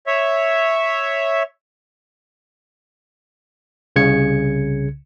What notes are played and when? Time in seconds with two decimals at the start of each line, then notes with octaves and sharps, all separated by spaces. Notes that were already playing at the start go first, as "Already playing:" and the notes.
0.07 C#5 E5
3.96 C2 C#3 G#6 C#7